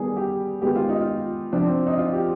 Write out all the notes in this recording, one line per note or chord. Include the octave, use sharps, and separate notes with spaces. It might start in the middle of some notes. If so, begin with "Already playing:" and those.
Already playing: D#3 G3 B3 G#4
G4
D#3 G#3 B3 G4
F4
D#4
F4
C3 F3 C4 D4
C4
D#4
F4
G4